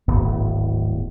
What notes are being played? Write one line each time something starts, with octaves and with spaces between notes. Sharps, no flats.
D1 G#1 A2 B3